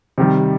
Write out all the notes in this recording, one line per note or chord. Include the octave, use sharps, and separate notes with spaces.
C3 D#3 G3